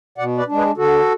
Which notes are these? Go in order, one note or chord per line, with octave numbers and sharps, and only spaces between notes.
B2 D5 F#5
B4 D5
G#3 D4
G#4 B4
D3 F#4 A4